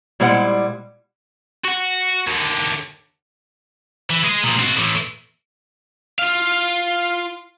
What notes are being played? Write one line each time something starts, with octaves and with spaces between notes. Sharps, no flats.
A#2 G3 G#3 E4 C5 F#5
F#4 F#5
D#2 D3
E3
G#3 G#4
A#2 F3
C4 F#4
A2 E3
F4 F5